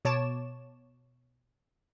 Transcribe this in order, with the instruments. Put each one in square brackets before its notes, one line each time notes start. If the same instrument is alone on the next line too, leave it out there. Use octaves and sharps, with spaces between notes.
[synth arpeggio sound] B2 C#5 A5 D6 E7